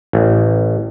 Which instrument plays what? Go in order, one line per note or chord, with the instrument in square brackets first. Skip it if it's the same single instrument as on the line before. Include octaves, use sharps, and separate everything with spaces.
[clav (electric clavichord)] A1